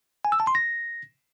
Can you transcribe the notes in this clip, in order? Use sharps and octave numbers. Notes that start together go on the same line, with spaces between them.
G#5
E6
A5
C6
A#6